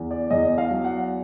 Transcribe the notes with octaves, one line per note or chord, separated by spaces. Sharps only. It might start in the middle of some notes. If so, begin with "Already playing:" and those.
Already playing: E2
D5
E2 D#5
F5
F#3
F#5